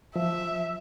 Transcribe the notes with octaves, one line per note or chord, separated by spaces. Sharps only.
F3 E5